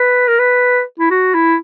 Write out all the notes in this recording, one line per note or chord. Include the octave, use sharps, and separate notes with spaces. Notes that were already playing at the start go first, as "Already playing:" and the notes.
Already playing: B4
A#4
B4
E4
F#4
E4